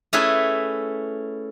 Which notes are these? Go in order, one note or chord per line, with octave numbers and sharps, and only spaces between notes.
A3 C#4 E4 G#4 B4